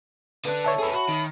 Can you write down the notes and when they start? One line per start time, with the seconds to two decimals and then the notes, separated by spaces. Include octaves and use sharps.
0.45 D3 D4 B4
0.65 C#5 E5 A5
0.78 G#4 A4 B4
0.93 F#4 B5
1.09 D#3